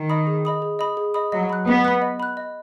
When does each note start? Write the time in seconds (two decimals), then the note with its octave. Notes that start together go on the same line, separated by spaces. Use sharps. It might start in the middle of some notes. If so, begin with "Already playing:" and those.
Already playing: D#3
0.10 D#5 B5 D#6
0.27 G#4
0.45 D#5 B5 D#6
0.62 G#4
0.79 D#5 B5 D#6
0.97 G#4
1.14 D#5 B5 D#6
1.32 F#3 D#5
1.49 B5 F#6
1.67 B3 D#5
1.85 B5 F#6
2.02 D#5
2.20 B5 F#6
2.37 D#5